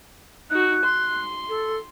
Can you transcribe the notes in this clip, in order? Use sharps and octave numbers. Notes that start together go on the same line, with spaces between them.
D#4 F#4 F#6
C6
A4